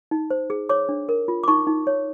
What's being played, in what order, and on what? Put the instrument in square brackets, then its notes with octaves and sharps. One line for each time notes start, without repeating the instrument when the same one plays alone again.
[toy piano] D#4
C5
G#4
C#5 D6
D4
A#4
F4
D6
D#4 C#6
D#4
C#5